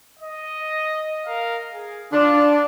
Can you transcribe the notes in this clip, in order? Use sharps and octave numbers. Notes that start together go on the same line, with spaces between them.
D#5
A#4 F5
G#4
D4 F4